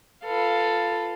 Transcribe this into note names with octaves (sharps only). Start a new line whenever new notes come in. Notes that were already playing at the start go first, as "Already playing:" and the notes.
F4 A4 B4 F5